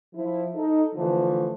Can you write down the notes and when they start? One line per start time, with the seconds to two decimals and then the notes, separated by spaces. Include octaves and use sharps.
0.14 F3 E4
0.55 D#4 A4
0.95 D3 E3 F3 A3